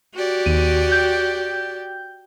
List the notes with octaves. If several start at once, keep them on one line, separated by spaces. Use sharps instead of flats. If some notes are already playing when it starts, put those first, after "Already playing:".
F#4 G4 D5
D#2 D#7
G5 G6